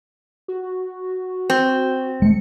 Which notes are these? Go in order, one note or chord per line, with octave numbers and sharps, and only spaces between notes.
F#4
C4
G#3 A3 C#7